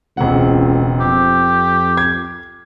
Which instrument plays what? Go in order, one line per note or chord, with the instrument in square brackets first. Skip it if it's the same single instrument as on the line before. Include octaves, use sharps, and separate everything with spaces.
[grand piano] E1 C4 F#5 [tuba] C#2
[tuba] F2 [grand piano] C4 [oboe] G4
[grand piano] G#6